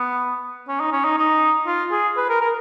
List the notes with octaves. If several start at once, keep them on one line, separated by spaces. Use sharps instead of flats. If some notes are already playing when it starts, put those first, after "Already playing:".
Already playing: B3
C#4
D#4
C#4
D#4
D#4
F4
G#4
B4
A#4
A#4